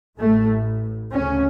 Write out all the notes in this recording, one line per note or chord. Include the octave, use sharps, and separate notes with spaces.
A1 A2 A3
D2 C#3 C#4